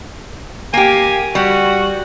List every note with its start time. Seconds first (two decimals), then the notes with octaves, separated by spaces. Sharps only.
0.74 A#3 G4 G#5
1.35 G3 F#4